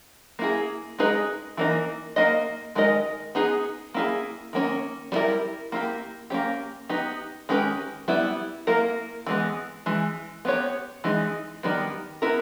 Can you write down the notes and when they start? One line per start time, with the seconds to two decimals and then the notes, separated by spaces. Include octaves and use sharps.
0.39 A#3 E4 G#4
0.99 G#3 D#4 G#4 B4 D#5
1.57 E3 A#3 D#4
2.16 A#3 D#4 A#4 D#5
2.75 D#3 G#3 D#4 A#4 D#5
3.35 B3 D#4 G#4
3.94 A#3 E4 G#4
4.53 D#3 A#3 C#4
5.12 G3 B3 E4 A#4
5.72 A#3 E4 G4
6.30 A#3 C#4 G4
6.89 B3 D#4 G4
7.49 D#3 G#3 C#4 G4 B4
8.08 G3 B3 E4
8.67 A#3 E4 A#4
9.26 E3 G#3 B3
9.86 E3 G#3
10.45 B3 G4 C#5
11.04 E3 G#3 D#4
11.63 D#3 G3 B3
12.22 B3 E4 A#4